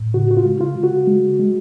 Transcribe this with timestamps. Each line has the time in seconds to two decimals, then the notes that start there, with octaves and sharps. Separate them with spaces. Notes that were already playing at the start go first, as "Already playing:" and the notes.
Already playing: A2
0.14 C#3 F#4
0.31 F#4
0.37 F4
0.45 G#3
0.61 F4
0.76 C#3
0.84 F#4
1.07 G#3
1.39 G#3